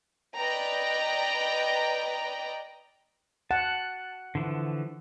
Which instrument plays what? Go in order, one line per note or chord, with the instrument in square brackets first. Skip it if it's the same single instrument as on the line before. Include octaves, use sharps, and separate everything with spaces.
[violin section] B4 D5 D#5 G5 A#5
[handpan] F#5 [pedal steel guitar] A5
[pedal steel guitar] D3 E3 F3